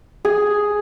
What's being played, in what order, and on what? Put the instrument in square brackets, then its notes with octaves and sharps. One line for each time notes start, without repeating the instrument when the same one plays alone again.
[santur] G#4